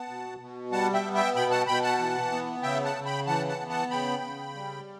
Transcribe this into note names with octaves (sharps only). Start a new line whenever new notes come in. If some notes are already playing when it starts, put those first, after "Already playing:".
Already playing: B3 F#5 A5
B2
B2
G3 F#5 A5
E5 G5
B3
E5 G5
B2 G5 B5
F#5 A5
B2 G5 B5
F#5 A5
E3
B3
C#3 E5 G5
F#5 A5
C#3
G5 B5
E3 F#5 A5
F#5 A5
B3
F#5 A5
C#3 G5 B5
C#3
G3